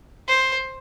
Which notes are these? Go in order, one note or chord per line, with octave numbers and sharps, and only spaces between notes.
C5